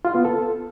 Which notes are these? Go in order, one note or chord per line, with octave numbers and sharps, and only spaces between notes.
F4
B3
A4